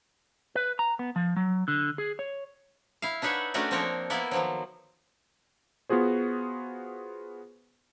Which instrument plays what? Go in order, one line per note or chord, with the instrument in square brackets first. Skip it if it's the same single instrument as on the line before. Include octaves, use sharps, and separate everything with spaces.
[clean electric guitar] B4
A#5
B3
F3
F#3
D3
G#4
C#5
[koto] E4 F5
D4 D#4 B4 C#5 E5 F#5
A3 C#4 D4 F#4 A#4 D5
F3 A#3 C4 D4 A#4 C#5
A#3 B3 E4 D5
D#3 F3 F#3
[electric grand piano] B3 F4 F#4 G#4 C5